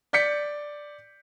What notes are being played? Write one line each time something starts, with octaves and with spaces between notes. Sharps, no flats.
D5 G6 B6 C#7